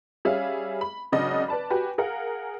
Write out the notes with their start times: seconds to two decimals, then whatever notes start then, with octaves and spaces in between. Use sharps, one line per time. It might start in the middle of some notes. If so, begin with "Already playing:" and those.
0.25 G3 C#4 G#4 E5 F5
0.81 B5
1.12 G#1 C#3 F#3 D4 D#5 F#5
1.48 B4 D5 A5 B5
1.70 F#4 G4 B4 G#5
1.98 G#4 A#4 F5 F#5